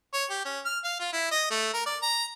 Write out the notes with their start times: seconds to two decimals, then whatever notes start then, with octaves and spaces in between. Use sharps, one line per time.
0.13 C#5
0.30 G4
0.45 C#4
0.65 F6
0.84 F5
0.99 F4
1.13 E4
1.31 D#5
1.50 A3
1.73 A#4
1.86 D5
2.02 A#5